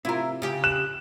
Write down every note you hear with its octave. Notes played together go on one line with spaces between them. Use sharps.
C3 E4 F4 A#4
C#3 G4
F#6 E7